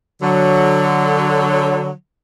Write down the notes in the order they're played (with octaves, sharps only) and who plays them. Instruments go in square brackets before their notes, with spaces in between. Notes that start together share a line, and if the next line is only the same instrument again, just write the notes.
[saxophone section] D3 F#3